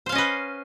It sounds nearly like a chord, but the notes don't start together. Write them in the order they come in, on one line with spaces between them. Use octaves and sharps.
C5 F5 C#4 D#5 B4